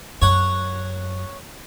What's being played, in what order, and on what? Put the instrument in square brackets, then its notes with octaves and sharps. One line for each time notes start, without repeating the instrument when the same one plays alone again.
[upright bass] F#2 [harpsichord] C#5 F#5